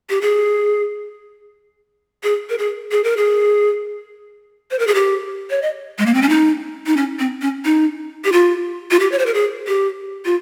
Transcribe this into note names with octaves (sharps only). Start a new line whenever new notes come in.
G4
G#4
G#4
A#4
G#4
G#4
A#4
G#4
C5
A#4
G#4
G4
C#5
D#5
G#3
A#3
C4
C#4
D#4
D#4
C#4
C4
C#4
D#4
G4
F4
F4
G4
C#5
C5
A#4
G#4
G4
F4